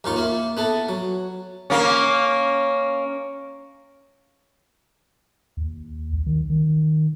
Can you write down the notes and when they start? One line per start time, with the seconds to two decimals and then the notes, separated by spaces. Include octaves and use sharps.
0.04 D#2 D#3 F4 C#6
0.16 A#3 E4
0.57 B3 E4 A4
0.89 F#3
1.70 A#3 C#4
5.57 D#2
6.13 C2
6.26 D#3
6.50 D#3